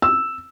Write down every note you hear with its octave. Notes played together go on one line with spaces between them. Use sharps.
E6